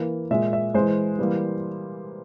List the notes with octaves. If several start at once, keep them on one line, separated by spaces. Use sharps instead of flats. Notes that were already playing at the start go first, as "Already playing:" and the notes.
Already playing: E3 A#3
A#2 G#3 E5
E5
E3 G#3 C5
E3 G3 A#3